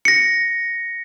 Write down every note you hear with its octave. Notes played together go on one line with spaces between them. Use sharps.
A#6 C#7